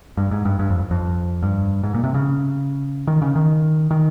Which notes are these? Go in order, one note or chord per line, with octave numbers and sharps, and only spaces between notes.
G2
G#2
G2
G2
F2
F2
G2
G#2
A#2
C3
C#3
D#3
C#3
D#3
D#3